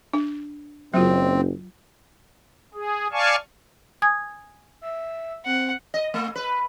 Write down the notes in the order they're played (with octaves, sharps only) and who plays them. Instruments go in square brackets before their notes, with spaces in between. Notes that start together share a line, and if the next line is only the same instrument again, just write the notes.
[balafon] D4
[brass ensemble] F#1 [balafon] F#3 F4 [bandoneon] C4
[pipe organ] G#4
D5 F5 G#5 A5 C#6
[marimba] G#5 D#6 G#6
[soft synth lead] E5
[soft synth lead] C4 [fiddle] F#5
[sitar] D#5
A3
B4